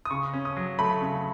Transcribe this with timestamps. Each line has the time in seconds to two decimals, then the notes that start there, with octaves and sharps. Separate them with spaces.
0.05 D#6
0.11 C#3 C#6
0.33 C#4
0.45 D#6
0.57 F#3
0.79 A3 B5
1.01 C#3